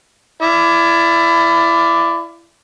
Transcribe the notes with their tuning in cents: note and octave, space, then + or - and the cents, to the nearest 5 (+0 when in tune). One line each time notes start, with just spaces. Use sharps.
E4 +25 D5 +0 F5 +0